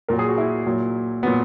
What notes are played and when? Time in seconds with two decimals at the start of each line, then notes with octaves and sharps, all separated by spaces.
0.09 A#2 F#3 A#4
0.19 G#4
0.29 F#4
0.38 E4
0.66 A#2 F#3
1.23 A#2 F#3 B3